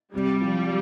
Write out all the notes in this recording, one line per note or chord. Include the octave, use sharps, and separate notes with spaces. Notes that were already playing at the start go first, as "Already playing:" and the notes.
C3 G3
F3